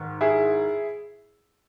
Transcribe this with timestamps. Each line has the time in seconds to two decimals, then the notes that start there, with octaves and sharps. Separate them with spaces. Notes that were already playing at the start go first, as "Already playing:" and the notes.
Already playing: G#2 D#3
0.21 E4 G#4